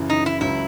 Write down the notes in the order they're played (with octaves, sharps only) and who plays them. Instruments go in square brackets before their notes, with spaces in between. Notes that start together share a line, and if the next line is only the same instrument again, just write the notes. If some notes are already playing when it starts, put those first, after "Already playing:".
Already playing: [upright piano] F#2 C#3 E3
[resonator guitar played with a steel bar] D#4
E4
[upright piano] C#2 C#3 F#3 [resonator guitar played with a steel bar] E4